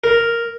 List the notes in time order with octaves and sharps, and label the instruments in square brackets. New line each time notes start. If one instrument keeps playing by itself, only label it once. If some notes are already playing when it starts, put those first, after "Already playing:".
[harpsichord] A#4